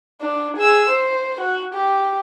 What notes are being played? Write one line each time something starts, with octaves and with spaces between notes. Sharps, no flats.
D4
G#4 E6
C5
F#4
G4